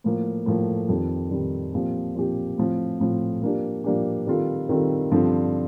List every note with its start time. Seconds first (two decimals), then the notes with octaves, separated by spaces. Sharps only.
0.04 A2 F3 A#3
0.46 A2 F3 A#3
0.89 F2 D#3 G3 C4
1.31 F2 D#3 G3 C4
1.73 A#2 F3 C4 G4
2.15 A#2 F3 C4 G4
2.58 A2 F3 C4
3.00 A2 F3 C4
3.42 F3 A#3 D4 G4
3.84 F3 A#3 D4 G4
4.27 D#3 G3 C4 F4 A4
4.69 D#3 G3 C4 F4 A4
5.12 G2 D3 F3 C4